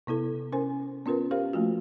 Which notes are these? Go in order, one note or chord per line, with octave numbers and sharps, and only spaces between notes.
C3 B3 E4 A4
C#4 A#4 C5 G#5
B3 C#4 F4 A#4 B4
C#4 G4 A#4 C5 F5
F3 A3 A#3 F4 F#4